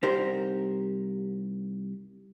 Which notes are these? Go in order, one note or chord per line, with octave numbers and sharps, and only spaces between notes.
C2 D#4 G4 A#4 C5